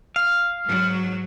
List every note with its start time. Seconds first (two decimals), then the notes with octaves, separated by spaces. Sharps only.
0.16 F5
0.65 G#2 F#3